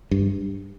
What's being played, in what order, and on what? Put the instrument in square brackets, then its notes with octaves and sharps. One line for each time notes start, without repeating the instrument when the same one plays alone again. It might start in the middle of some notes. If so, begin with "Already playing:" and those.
[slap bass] G2